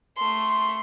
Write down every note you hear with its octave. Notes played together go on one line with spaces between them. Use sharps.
A3 C6